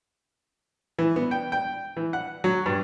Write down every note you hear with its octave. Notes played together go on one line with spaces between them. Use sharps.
E3
B3
G5
G5
E3
F#5
F#3
G2